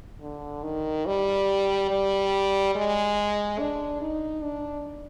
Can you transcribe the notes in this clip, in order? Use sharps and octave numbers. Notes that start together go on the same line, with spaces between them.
D3
D#3
G3
G3
G#3
D4
D#4
D4